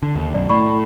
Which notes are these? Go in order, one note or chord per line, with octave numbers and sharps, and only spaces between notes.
D3
D#2
B1 F#2 D5
A2 D5 B5 C#6